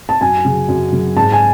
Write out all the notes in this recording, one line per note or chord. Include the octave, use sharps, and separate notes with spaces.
A5
F#2 G#5
C#3 F#3
F#2
C#3 F#3
G#2 A5
G#5